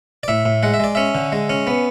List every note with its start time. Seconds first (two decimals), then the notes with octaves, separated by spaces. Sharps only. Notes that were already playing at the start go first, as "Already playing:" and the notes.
0.23 D5
0.28 A2 E5
0.45 A2
0.63 G#3 F#5
0.74 E5
0.80 G#3 D5
0.95 C#4 E5
1.15 D3
1.32 G#3
1.49 C#4
1.67 B3